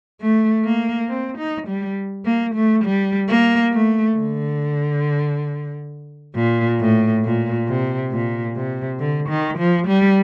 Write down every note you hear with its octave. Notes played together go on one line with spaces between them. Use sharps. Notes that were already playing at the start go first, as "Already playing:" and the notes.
A3
A#3
C4
D#4
G3
A#3
A3
G3
A#3
A3
D3
A#2
A2
A#2
C3
A#2
C3
D3
D#3
F3
G3